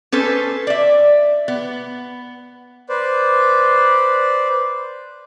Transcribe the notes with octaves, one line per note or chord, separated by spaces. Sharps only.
C#4 A4 B4 C5
D5 E5
B3
B4 C5 D5